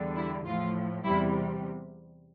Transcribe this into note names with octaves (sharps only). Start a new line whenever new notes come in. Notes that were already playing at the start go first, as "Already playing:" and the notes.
Already playing: E2 D3 G3
E4
A2 F3 F4
E2 C3 G3 E4